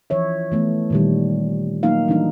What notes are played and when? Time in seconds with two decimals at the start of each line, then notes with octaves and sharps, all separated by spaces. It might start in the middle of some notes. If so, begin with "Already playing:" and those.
0.10 E3 F3 C#5 E5
0.52 E3 A3 B3
0.90 A#2 D#3 G3
1.83 F#3 A#3 D#4 F5
2.08 E3 G3 D4 D#4